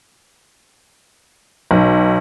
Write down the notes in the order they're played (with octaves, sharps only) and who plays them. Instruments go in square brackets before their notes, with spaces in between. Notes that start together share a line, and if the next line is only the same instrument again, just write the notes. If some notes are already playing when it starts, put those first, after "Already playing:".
[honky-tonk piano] B1